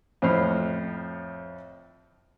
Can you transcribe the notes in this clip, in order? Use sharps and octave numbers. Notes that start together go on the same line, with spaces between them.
F2 A2 C5 B5 F6